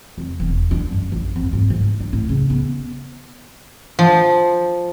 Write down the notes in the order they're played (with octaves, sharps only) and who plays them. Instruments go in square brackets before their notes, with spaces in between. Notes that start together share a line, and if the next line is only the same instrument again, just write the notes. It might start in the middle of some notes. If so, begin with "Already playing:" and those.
[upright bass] F2
E1
D4
F#2
A1
F2
G#2
G#2
D4
A2
C#3
B3
[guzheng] F3